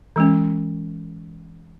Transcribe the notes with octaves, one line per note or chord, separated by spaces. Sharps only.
E3 G#3 C#4